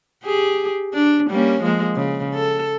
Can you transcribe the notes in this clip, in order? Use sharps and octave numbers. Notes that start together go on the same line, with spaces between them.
G4 G#4
D4
G3 A#3 C#4
F3 G#3 A#3
C#3
A4